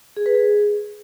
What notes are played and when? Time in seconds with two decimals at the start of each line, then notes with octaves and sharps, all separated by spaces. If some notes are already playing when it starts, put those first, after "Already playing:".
0.17 G#4
0.26 B4
0.35 G#4